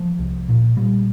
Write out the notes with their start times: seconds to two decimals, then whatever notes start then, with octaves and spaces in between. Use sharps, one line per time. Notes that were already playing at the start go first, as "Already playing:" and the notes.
Already playing: F3
0.19 C2
0.49 A#2
0.77 A#2 G3